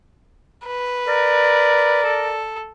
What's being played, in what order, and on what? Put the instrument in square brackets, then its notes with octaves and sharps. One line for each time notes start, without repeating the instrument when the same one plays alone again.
[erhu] B4
[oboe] A#4 [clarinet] D5
[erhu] A4